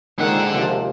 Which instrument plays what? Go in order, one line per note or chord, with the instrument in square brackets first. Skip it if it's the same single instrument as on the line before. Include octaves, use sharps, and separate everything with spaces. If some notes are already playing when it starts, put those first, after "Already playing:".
[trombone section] A#2 D#3 [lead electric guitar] D3 F#5 [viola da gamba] G#3 C5
[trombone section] D#2 C3 F3